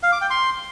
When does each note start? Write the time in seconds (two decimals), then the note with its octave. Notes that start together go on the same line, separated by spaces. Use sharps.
0.03 F5
0.12 D6
0.21 G5
0.30 C6